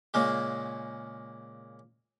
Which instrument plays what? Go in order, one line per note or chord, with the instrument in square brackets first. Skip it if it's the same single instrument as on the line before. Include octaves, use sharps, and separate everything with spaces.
[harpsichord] A#2 C#3 G#3 A#3